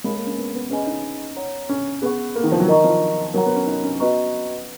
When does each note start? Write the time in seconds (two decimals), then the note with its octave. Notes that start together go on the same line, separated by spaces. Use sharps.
0.04 G#3 A#4 C#5 F5 B5
0.15 A#3
0.26 C#4
0.38 B3
0.54 B3
0.70 C#4 G#4 B4 D#5 G#5 B5
0.87 D#4
1.36 C#5 F#5 A#5
1.69 C#4
2.02 B3 G#4 B4 F#5 C#6
2.36 A#3
2.44 D#3
2.52 F3
2.60 F#3
2.68 D#3 A#4 D#5 A#5 C#6
2.84 F3
3.34 F#3 A#4 C#5 F#5 A#5
3.46 B3
3.56 C#4
3.67 D#4
3.84 C#4
4.00 B3 F#4 B4 D#5 A#5 C#6